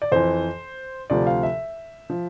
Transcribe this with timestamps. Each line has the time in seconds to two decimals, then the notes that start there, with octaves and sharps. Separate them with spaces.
0.02 D5
0.12 F2 E3 C5
1.10 D2 C3 F3 D5
1.27 F5
1.43 E5
2.10 F3